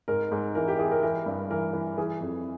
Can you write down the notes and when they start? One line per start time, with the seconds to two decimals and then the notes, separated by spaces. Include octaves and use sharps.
0.08 G#2 A#4
0.32 G#2
0.55 E3 A#4
0.68 G4
0.79 E3 G#4
0.91 A#4
1.03 E3 A#4
1.26 G2
1.50 E3 A#4
1.73 E3
1.97 E3 G#4
2.21 F2